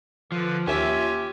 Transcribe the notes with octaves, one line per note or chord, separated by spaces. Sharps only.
D3 F3 B4
D#2 C#4 F4 G4 E5 B6